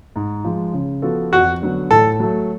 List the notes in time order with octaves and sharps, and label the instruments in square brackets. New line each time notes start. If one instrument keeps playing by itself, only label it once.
[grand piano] G#2
F3 G#3
C#3
F3 B3 F#4 A4
[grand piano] F2 [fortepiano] F#4
[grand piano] D3 F#3 B3
[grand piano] A2 [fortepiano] A4
[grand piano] F#3 A3